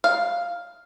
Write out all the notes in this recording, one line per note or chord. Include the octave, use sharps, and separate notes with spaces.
F5